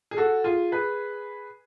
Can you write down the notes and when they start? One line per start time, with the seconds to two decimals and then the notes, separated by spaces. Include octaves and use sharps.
0.11 G#4
0.17 F#4 A4
0.44 F4 G#4
0.72 G#4 B4